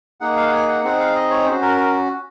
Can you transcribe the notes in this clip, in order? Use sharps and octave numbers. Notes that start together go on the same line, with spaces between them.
A#3 D#4 G#4 F#5
F5
F#5
G#5
F#5
C4 D#4 G#4 F#5
F5
D#5
C#5
C#4 F#4 C5
A#4
A#4